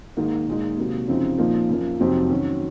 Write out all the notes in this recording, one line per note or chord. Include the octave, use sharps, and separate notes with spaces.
G#2 D#3 A#3 D#4
A#2 G#3 D#4
C3 F#3 A#3
F#2 C#3 F3 C4 D#4
A#2 F3 A#3 D#4
F#2 F3 A#3
F2 C3 F#3 C4 D#4
D#3 F#3 C#4